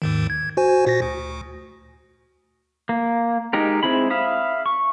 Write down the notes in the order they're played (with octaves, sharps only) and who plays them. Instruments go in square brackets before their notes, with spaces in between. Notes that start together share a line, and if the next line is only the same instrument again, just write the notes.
[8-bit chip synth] D#2 G#2 D#3
G#6
F#4 C5 G#5
A#2 F#4 A#6
D2
[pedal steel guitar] A#3
G#3 D#4 G4 A#4
G#3 C4 E4 G#4 B5
E5 F5 B5 D#6
C#6